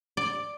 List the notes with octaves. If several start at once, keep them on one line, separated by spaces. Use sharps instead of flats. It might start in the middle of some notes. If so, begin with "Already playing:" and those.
D5